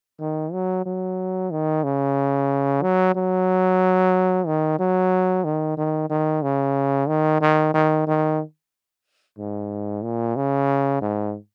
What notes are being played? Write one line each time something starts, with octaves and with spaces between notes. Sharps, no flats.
D#3
F#3
F#3
D#3
C#3
F#3
F#3
D#3
F#3
D#3
D#3
D#3
C#3
D#3
D#3
D#3
D#3
G#2
A#2
C#3
G#2